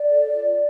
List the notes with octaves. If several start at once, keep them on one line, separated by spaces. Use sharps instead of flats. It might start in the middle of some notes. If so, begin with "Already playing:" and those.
Already playing: D5
A4 C#5
F4